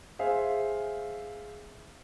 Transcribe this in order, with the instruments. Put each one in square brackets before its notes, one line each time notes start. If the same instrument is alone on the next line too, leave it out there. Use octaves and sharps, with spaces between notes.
[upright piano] G#4 C5 E5 F5 G#5